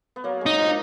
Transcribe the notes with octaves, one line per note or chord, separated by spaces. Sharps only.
B3
F#3 A#3
G#3 D#4
F3